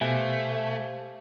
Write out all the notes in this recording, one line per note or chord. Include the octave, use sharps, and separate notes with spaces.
B2 A3 G4 C5 E5 F5 G#5